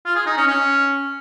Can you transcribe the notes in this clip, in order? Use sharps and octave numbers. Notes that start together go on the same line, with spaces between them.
F4
G#4
D#4
C#4
C#4